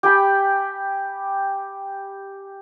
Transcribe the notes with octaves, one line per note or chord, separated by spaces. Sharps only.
G4 G5 G#5 B5